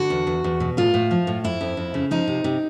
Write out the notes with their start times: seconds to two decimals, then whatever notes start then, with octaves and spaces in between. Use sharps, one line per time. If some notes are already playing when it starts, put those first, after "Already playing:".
Already playing: D3 F#4
0.10 E2
0.27 E2
0.44 E2
0.60 B2
0.77 A2 F4
0.94 A2
1.11 F3
1.27 A2
1.44 F2 E4
1.61 F2
1.77 F2
1.94 C#3
2.11 F3 D#4
2.28 C3
2.44 C3